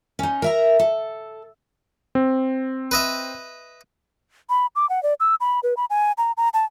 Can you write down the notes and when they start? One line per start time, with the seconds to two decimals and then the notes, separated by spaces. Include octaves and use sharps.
0.19 C#4 D#4
0.42 A#4 E5 A#5
0.79 A4
2.15 C4
2.91 B4 D#5 E5
4.50 B5
4.76 D6
4.89 F#5
5.03 D5
5.20 E6
5.41 B5
5.63 B4
5.77 B5
5.90 G#5
6.18 A#5
6.37 A#5
6.54 A5